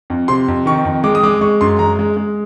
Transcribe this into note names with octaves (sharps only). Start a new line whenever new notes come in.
F2
C3 C6
F2
D#3 C#6
F2
G#3 D6
D#6
G#3 D6
G#3 C#6
F#2 C6
G#3 A#5
G#3
G#3